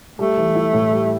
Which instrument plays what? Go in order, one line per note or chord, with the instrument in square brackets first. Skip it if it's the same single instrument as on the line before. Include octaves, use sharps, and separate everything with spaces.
[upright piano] G3 [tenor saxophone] A3
[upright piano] E3
E4
A2
G3